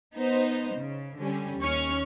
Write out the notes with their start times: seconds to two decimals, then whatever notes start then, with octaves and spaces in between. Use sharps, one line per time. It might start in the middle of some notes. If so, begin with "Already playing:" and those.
0.16 B3 D#4 C5
0.77 C#3
1.20 D3 G3 C#4
1.59 D#2 C#4 C#6 F6